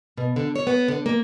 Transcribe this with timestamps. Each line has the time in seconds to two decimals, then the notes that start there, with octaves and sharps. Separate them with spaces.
0.17 B2
0.36 D3
0.56 C#5
0.67 B3
0.88 D3
1.06 A#3